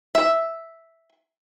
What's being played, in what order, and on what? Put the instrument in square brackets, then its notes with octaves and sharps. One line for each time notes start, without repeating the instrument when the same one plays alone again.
[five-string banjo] E5